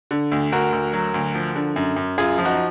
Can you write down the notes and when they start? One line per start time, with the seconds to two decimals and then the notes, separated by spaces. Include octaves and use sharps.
0.11 D3
0.32 D2
0.52 D2 F#4 A#4
0.72 D2
0.93 F#3
1.14 D2
1.35 F3
1.56 D3
1.76 F#2
1.96 F#2
2.18 F#2 F4 G#4
2.38 F3
2.45 D#4 F#4